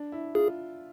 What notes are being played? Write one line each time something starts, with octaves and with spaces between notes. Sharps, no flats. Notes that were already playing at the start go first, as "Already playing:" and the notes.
Already playing: D4
E4
F4 G#4